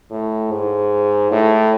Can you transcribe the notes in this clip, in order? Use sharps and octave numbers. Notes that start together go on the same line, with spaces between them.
A2
G#2
A2